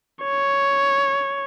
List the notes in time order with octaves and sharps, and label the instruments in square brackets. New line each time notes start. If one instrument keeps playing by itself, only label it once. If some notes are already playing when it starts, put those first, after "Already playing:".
[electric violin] C#5